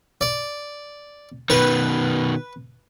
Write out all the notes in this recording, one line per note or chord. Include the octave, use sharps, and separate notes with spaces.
D5
B2 D#3 B4